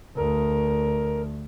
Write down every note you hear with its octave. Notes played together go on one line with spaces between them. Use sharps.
D2 A#4